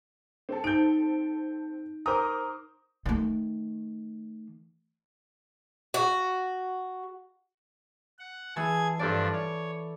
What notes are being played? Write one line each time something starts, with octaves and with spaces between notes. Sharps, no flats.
C4 A4
D#4 G6 D7
A#4 C5 A#5 D6 D#6
D#3 A3
F#4
F#5
E3 G#4 A5 G#6
G2 F3 D4 A4 D5
C#5